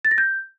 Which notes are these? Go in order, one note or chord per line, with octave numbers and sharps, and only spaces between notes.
A6
A#6
G6